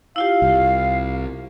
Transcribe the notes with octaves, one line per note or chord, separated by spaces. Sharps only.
E4 F4 G4 F5
C2